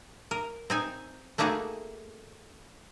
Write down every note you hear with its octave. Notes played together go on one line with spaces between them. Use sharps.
A#4
C4 D#4 G#5
A3 A#3 D#4 E4 F#4 G#4